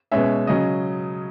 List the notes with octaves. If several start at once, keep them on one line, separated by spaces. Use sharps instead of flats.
B2 G#3 C#4 E5
C#3 F#3 C#4 D#5